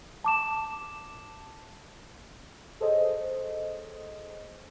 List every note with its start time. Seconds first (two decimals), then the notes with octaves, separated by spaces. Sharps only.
0.24 A5 D6 E7
2.80 G#4 A4 C5 C#5 D#5